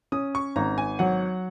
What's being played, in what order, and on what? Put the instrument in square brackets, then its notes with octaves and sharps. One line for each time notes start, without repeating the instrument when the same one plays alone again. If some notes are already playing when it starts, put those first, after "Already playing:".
[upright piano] C#4 [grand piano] D#6
[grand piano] C#6
[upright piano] G#1 [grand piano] A#5
[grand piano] G#5
[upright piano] F#3 [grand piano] F#5